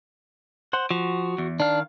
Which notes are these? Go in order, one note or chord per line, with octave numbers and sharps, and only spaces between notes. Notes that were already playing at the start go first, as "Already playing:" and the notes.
C5 F#5
F3 F#4
E2
D#3 D4 F5